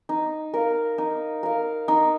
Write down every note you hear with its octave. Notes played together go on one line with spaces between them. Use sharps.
D#4
A#4 F5
D#4
A#4 F5
D#4